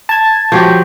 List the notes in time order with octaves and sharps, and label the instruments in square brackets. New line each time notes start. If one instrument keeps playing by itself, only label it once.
[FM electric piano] A5 G#6
[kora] F3 F#3 G4